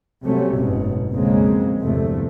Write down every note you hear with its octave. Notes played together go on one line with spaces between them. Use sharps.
C3 F#3 G3 A3 A#3 C#4
F#1 G#2 B2
B1 F2 C#3 G#3 A#3 C4
G1 E2 C3 F3 A3